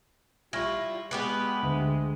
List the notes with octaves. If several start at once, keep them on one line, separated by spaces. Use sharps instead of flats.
G3 E4 F4 C#6 F6 A#6
G#3 B3 G4 B4
D2